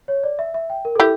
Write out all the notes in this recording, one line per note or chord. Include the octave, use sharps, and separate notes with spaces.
C#5
D5
E5
E5
G5
A#4
E4 G4 A4